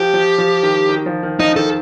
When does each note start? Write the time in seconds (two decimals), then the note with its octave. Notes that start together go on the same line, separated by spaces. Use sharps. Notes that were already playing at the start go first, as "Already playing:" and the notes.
Already playing: F3 G4
0.14 F3
0.38 F3
0.63 D#3
0.89 D#3
1.06 F3
1.23 D#3
1.39 F3 D#4
1.56 D#3 A4